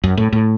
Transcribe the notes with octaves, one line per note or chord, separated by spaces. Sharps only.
F#2
A2
A2